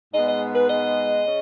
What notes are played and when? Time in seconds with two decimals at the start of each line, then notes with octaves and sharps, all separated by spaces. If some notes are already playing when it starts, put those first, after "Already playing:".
0.13 G#2 G#3 B3 D#5
0.27 D#5
0.54 B4
0.68 D#5
1.26 C#3